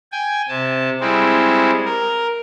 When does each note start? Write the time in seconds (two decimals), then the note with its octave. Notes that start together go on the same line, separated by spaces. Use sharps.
0.12 G5 G#5
0.49 C3 A5
1.01 G3 G#3 C4 E4
1.85 A#4